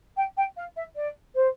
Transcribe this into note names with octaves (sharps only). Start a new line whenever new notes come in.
G5
G5
F5
E5
D5
C5